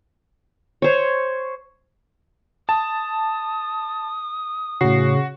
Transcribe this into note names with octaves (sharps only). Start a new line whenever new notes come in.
C5 C#5
A5 D#6
A2 C#3 F#4 C7